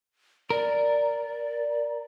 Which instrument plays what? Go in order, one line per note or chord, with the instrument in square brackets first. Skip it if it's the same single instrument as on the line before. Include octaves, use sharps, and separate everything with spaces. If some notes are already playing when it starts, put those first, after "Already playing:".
[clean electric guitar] A#4 [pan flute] D5